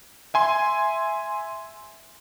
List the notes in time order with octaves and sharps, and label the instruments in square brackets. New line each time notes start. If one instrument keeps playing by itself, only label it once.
[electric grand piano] E5 G#5 C6